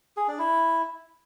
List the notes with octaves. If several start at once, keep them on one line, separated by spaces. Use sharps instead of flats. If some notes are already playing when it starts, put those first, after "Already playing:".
G#4
D4
E4